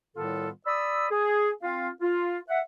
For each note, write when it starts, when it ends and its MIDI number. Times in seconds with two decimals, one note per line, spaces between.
0.16 0.49 45
0.16 0.49 51
0.16 0.49 55
0.16 0.49 59
0.16 0.49 65
0.16 0.49 69
0.66 1.06 74
0.66 1.06 83
0.66 1.06 87
0.66 1.06 88
1.11 1.49 68
1.63 1.89 60
1.63 1.89 65
1.63 1.89 77
2.01 2.37 65
2.49 2.59 76
2.49 2.59 78